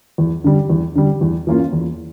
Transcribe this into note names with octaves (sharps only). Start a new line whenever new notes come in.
E2
D3 G3
E2
D3 G3
E2
E3 A#3 C#4 F4
E2